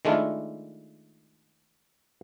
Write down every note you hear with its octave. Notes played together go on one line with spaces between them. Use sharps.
D#3 G#3 A3 D4 E4 F4